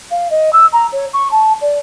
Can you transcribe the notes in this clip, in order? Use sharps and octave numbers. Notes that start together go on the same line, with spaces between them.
F5
D#5
E6
A#5
C#5
C#6
A5
D5